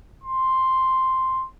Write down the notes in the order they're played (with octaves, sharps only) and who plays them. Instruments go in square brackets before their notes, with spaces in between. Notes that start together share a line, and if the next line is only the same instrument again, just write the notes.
[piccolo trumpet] C6